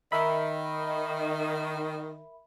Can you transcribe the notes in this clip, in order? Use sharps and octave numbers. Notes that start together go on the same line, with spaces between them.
D#3 A#4 E5 B5